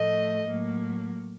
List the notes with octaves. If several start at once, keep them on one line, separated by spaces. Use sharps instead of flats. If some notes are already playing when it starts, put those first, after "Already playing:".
Already playing: A2 F3 A3 D#5
A2 F#3 A#3